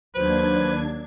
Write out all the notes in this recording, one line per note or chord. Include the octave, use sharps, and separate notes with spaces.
D#2 F#3 A#3 D4 B4 C5 G#6